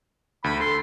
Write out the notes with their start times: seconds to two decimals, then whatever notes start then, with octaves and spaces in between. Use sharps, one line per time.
0.44 D2 B5
0.60 A4 C6